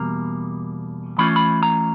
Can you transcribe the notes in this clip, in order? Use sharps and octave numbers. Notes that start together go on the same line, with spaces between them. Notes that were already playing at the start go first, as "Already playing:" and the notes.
Already playing: E2 B2 G3 A#3 A#5
E3 A3 C#4 F4 B5
B5
A#5